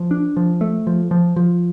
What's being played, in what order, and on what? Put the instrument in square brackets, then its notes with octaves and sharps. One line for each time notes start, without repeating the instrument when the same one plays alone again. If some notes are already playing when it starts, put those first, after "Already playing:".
Already playing: [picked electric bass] F3
D4
F3
A3
F3
F3
F3